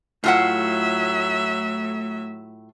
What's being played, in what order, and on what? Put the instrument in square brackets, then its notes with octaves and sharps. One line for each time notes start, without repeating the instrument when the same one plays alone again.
[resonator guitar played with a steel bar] A2 F4 F#5 [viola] F#3 E5 [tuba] A3